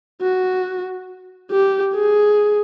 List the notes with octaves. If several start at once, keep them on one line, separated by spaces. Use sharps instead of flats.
F#4
G4
G#4